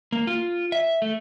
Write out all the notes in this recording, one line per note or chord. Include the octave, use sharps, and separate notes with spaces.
A#3
F4
E5
A3